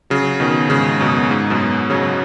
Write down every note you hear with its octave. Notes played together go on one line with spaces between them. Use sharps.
C#3 F#3
B2 D#3
G#2 C#3
F#2 B2
G#2
F#2 B2
C#3 F#3